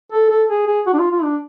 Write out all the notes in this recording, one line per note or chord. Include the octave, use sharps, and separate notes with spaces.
A4
A4
G#4
G#4
F#4
D4
F4
F4
D4